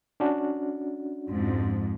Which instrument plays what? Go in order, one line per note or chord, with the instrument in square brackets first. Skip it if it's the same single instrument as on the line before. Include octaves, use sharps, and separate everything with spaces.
[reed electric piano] C#4 D4 F#4
[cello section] F2 G#2